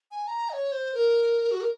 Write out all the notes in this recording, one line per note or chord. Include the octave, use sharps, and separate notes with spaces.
G#5
A#5
D#5
C#5
C5
A#4
F#4
A#4